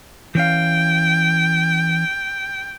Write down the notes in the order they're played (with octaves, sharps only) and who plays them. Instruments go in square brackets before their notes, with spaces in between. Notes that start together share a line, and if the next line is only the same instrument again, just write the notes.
[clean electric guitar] E3 C#4 F5 [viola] G5